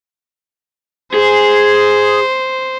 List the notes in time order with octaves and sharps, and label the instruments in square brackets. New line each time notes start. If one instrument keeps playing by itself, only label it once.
[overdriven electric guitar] G#4 [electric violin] C5